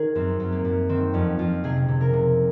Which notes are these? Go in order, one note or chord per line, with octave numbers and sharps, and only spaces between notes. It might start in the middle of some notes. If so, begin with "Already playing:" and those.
Already playing: D#3 G#4 A#4
F#2 C4
F#2
A#3
F#2
D#3 C4
F2 C#4
F2 F4
C3 G#4
C3
A#4
C3